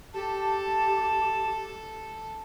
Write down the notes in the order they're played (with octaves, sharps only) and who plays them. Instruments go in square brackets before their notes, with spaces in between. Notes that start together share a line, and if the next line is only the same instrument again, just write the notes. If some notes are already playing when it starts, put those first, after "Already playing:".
[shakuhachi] G4 [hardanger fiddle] A4 [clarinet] A5